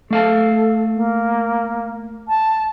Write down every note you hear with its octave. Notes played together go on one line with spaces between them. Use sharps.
A3 A4 F5 A5
A#3
A5